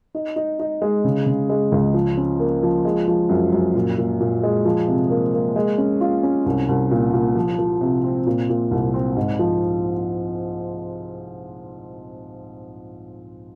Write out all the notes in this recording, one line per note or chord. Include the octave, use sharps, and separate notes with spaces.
D#4
D#4
D#4
G#3
C#3
C#3
G#3
C#2
F3
C#4
A#3
F3
G#3
F3
F#2
F#2
A#2
A#2
A#2
G#3
F3
C3
A#3
A#3
G#3
C#4
F4
C#4
C2
C2
A#2
A#2
F3
F3
C3
C4
A#2
A#2
C2
C4
G#2
F3